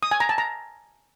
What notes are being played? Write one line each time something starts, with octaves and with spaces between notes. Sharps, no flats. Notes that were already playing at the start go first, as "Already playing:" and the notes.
D#6
G#5
A#5
A5
A#5